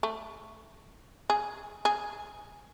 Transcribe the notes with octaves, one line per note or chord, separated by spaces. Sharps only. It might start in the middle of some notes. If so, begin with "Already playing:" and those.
A3
G#4
G#4